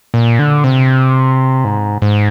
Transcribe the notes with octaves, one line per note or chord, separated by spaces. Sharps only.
A#2
D3
C3
G#2
G#2